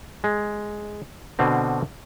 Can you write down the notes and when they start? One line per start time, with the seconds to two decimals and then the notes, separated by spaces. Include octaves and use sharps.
0.24 G#3
1.39 B2 D3 C4